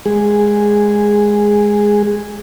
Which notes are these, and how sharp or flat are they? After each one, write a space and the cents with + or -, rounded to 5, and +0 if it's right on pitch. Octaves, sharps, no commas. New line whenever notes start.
G#3 +0 G#4 -10